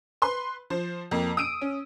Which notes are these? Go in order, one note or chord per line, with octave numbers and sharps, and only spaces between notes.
B4 C6
F3 C5
F2 A#3
D#6 E6 D7 D#7
C#4